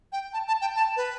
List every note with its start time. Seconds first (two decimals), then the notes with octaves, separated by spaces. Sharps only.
0.12 G5
0.33 A5
0.48 A5
0.61 G5
0.75 A5
0.96 B4